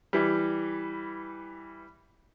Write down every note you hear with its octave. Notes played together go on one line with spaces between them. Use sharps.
E3 G3